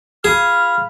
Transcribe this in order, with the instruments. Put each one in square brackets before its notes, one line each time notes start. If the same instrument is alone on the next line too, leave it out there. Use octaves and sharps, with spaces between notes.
[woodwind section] F4 B5 F6 [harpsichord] G#4